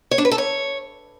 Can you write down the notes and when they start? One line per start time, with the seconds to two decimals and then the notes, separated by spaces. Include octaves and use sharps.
0.11 C#5
0.18 D4
0.25 B4
0.31 A4
0.38 C#5